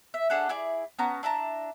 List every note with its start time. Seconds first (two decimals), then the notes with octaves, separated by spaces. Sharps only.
0.14 E5
0.30 D4 G#4 A4 F#5
0.49 E4 G#4 D5
0.99 B3 C#4 A5 A#5
1.23 D4 E4 A5 A#5